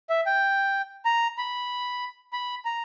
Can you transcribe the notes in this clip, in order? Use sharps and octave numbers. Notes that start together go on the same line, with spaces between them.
E5
G5
A#5
B5
B5
A#5